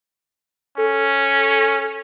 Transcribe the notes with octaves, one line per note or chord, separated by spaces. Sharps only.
C#4 A4